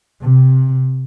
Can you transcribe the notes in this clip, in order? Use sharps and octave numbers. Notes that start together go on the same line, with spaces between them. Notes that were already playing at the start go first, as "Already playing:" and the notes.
C3